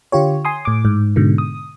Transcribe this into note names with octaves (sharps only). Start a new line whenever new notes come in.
D3 F4 G4 C#5
G#5 C6 D#6
A2 D6
G#2
G#2 B2 D3
D#6